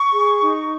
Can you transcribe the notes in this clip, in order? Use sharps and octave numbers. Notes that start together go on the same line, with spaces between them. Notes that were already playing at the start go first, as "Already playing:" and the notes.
Already playing: C#6
G#4
D#4